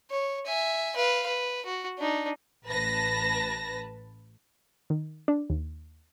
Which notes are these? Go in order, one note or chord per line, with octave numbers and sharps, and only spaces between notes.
C#5
E5 G#5
B4 F5
B4
F#4
D4 D#4
A1 B4 A5 A#6
D#3
D4
D#2